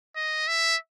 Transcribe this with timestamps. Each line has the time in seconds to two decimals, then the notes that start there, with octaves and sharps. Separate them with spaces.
0.16 D#5
0.48 E5